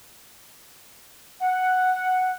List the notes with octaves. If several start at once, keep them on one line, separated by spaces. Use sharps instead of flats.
F#5